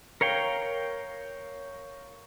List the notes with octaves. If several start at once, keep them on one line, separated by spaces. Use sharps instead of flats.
A#4 C#5 F5 G5